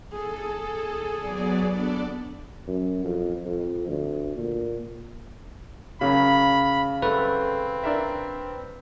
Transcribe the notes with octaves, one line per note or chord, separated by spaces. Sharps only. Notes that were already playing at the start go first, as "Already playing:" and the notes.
G#4 A4
G#4
F#3 B3 D5
B3 D4 A4 D5
F#2
F2
F2
D2
A#2
C#3 F#3 A#3 C#4 B5
F#2 G3 A3 C4 B4
D4 A#4 E5